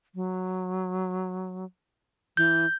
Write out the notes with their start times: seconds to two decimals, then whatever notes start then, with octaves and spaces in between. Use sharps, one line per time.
0.15 F#3
2.37 E3 G6